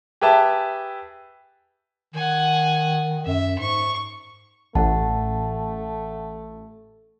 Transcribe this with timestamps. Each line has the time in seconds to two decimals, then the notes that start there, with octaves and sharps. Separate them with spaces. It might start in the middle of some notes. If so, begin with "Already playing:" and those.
0.21 G4 G#4 B4 E5 A5
2.14 D#3 F#5 G#5
3.26 F#2 E5
3.59 G#2 C#6
4.75 A1 A3 F#5 A5